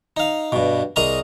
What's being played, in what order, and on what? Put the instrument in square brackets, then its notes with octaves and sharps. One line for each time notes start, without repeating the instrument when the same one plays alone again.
[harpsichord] D#4 F5
G2 B2
C2 G#4 A#4 D#5 A#5